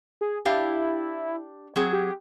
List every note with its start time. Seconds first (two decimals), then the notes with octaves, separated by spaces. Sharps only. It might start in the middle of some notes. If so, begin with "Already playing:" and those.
0.21 G#4
0.45 D4 E4 G4 F5
1.76 F#3 C4 G#4
1.93 G4